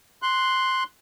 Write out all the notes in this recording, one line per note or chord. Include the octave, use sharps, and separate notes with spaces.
C6 F#6